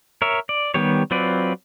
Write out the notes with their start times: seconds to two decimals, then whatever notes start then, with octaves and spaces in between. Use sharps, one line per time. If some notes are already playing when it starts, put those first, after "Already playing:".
0.22 A#4 C#5 E5
0.49 D5
0.74 D#3 G3 B3 G4 C#5
1.11 F#3 C4 F4 B4 D5